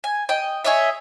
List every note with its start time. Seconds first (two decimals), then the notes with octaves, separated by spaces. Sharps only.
0.04 G#5
0.29 D#5 G5
0.64 G#4 C#5 D#5 E5